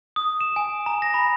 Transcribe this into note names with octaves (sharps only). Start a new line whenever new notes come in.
D#6
E7
G#5
A#5
A#6
B5